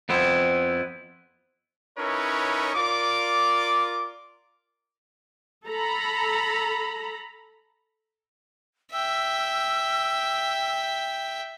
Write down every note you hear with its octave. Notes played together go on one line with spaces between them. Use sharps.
F2 B3 C4 E4
C#4 D#4 E4 A#4 B4 C#5
F4 A#4 D5 D6
A4 A#5 B5
E5 G5 E6